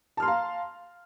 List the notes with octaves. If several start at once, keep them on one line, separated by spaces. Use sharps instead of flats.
F5 A5 A#5 C6 F6